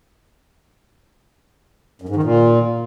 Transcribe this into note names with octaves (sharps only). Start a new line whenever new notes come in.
F#2
G#2
D#3
A#2